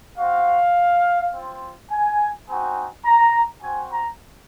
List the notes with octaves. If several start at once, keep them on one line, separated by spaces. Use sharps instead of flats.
C4 F#4 F5
C4 F4
G#5
C4 D#4 F#4 G#5
A#5
C4 F#4 G#5
A#5